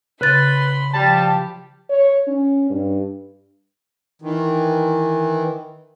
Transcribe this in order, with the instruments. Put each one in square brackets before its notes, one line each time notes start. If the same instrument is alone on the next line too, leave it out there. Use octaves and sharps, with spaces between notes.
[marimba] C#3 A6 [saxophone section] B4 [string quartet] B5 C6
[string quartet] F3 G4 [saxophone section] G3 [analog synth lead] A5
[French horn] C#5
C#4
G2
[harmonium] D#3 E3